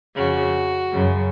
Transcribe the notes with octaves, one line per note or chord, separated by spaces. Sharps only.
F2 C#3 F#4
F#2 C#3